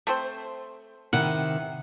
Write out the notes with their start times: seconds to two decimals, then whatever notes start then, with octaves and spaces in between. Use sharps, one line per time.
0.07 A3 C4 C5
1.13 C3 D#3 E4 F#5